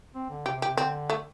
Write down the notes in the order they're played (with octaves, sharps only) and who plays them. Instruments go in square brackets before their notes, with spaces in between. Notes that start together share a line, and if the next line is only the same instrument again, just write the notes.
[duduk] C4
D3
[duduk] C3 [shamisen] G4
[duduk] C3
[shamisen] G4
[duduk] C3
[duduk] D3 [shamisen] C4
[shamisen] A3